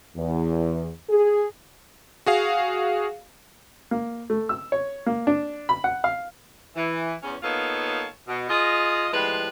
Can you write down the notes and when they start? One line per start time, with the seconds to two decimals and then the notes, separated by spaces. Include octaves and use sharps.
0.16 E2
1.09 G#4
2.26 F#4 G#4 F5
3.91 A#3
4.30 A3
4.49 E6
4.72 C#5
5.06 A#3
5.27 D4
5.69 B5
5.84 F#5
6.04 F5
6.75 E3
7.23 E2 C#4
7.42 A#3 B3 D#4 F4 A4 C#5
8.27 B2
8.49 F4 G#4 D#5
9.12 A2 F3 G3 G#3 B4